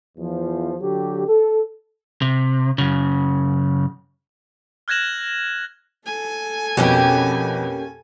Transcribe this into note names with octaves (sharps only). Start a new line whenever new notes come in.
E2 F3
D3 F#3 G4
A4
C3
F#2 C#3
F6 F#6 G#6 A#6 E7 F#7
A4 G#5
F2 B2 A#3 C#4 G4